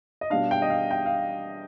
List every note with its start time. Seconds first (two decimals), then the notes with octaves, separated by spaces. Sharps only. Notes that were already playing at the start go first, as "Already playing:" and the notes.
0.21 D#5
0.30 B2 G3 D4 F5
0.51 G5
0.62 D#5
0.70 F5
0.91 G5
1.06 F5